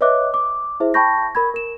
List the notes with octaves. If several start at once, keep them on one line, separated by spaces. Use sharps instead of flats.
B4 C#5 D#5 E5 D6 F#6
D6
E4 G#4 C5 E5
G5 A5 B5 C#6 G6 A#6
A#4 B5 G#6
A#4 E7